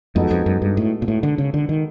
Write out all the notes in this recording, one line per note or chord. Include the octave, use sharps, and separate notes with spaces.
F2 G#3 B3 D#4 F#4 A4
F2
F#2
G2
A2
A#2
A2
D3
C#3
D3
D#3